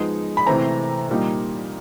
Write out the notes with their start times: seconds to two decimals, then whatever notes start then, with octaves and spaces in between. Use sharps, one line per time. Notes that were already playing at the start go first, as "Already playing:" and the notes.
Already playing: F3 G#3 B3 D#4
0.37 B5
0.47 C3 E3 A3 C4 A#5
1.09 A#2 G3 A#3 D#4